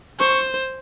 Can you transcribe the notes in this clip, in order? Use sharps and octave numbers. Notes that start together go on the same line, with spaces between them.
C5 C#6